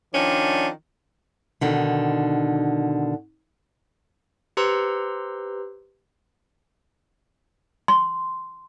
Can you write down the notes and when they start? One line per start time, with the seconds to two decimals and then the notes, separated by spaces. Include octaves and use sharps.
0.14 D#3 F3 C#4 D4
1.61 B2 D3 D#3
4.57 G4 B4 C5 A#5 C6 E6
7.88 C6